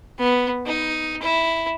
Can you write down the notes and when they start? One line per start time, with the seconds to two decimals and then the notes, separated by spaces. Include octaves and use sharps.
0.19 B3
0.66 D#4
1.22 E4